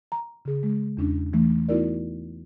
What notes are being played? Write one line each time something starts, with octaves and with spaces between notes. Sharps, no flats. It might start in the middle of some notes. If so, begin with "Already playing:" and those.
A#5
C#3 G#4
G#3
E2 C#4 D4
E3 A3
B3 D#4 E4 F#4 A#4 D5